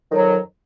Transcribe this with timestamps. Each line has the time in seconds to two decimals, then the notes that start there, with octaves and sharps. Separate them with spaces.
0.10 F2 D#3 F#3